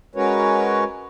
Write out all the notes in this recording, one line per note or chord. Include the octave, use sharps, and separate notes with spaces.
G#3 C#4 F#4 A#4 B4 C#5